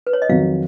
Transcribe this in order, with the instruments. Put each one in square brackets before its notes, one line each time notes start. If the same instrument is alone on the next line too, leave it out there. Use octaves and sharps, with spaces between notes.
[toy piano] B4
C#5
D#5
[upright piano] F2 D#3 F#3 [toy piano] F5